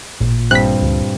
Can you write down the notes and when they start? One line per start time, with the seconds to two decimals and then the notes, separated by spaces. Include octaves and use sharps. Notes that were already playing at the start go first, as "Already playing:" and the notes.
0.20 A1 A#2
0.51 G2 C4 F#6 B6
0.82 D2